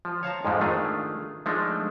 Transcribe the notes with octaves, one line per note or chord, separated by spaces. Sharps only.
F3
C#5 F5 A5 A#5
F2 G#2 F3 G#3 A3
D#3 A3 D4 F4 G#4
F3 G#3 A3 D4 D#4